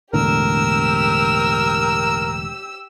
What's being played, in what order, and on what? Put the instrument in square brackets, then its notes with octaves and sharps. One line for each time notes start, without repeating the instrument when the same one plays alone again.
[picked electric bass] E1 A2 D3 [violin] G4 E6 [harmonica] A#4